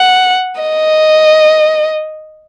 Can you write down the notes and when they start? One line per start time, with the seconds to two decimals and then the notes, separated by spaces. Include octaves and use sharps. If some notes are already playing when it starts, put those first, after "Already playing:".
Already playing: F#5
0.61 D#5